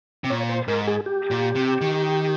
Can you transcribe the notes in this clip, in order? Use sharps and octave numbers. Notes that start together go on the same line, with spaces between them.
C3
A#2 C#5
C5
G#2 A#4
G#4
G4
A#2
C3
D#3